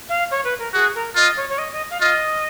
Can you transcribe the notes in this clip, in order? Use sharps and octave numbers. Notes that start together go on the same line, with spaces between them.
F5
C#5
B4
A#4
F#4 G#4
A#4
F4 D#5
C#5
C#5
D#5
D#5
F5
F4 D#5